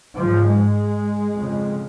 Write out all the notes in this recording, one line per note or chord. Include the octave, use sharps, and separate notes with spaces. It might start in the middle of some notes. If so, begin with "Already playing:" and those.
G#2 F3
G#3
F2 C#3